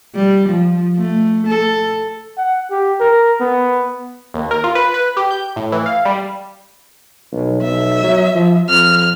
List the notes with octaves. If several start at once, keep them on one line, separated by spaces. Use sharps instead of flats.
G3
F3
A3
A4
F#5
G4
A#4
B3
D#2
A#4
F4
B4
B4
G4
G6
A2
E3
F5
G3
B1
B1 E5
F#3
F3
F2 F6